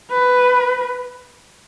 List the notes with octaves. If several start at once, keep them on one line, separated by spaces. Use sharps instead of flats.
B4